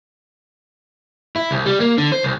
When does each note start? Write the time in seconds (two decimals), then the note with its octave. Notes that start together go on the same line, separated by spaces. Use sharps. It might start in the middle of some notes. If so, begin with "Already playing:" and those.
1.36 E4
1.51 C2
1.66 G3
1.80 A#3
1.98 D3
2.12 C5
2.23 C2